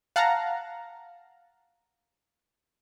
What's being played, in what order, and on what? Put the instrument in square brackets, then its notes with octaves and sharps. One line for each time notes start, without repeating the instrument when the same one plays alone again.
[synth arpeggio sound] F5 F#5 A5 A#5 F6